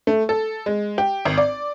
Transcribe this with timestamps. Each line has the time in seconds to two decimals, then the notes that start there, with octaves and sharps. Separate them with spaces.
0.07 A3
0.29 A4
0.66 G#3
0.98 G4
1.25 G#1
1.38 D5